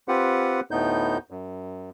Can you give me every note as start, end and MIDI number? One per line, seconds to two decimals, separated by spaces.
0.08 0.61 60
0.08 0.61 65
0.08 0.61 67
0.08 0.61 71
0.08 0.61 78
0.71 1.18 38
0.71 1.18 45
0.71 1.18 57
0.71 1.18 59
0.71 1.18 63
0.71 1.18 91
1.30 1.90 42